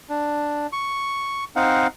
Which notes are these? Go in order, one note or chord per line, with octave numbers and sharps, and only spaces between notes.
D4
C#6
C4 D#4 F5 F#5